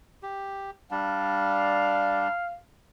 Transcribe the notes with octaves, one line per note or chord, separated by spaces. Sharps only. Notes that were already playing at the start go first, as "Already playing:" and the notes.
G4
G3 D4 F5